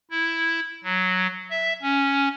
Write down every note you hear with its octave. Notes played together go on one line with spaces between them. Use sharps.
E4
F#3
E5
C#4